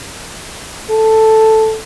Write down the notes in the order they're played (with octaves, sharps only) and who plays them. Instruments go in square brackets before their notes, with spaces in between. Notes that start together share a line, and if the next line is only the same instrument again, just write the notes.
[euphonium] A4